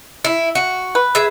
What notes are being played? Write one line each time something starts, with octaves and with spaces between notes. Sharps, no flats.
E4
F#4
B4
G#4 E5